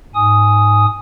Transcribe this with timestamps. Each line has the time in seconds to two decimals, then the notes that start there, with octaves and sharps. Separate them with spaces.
0.15 G#2 G#5 D#6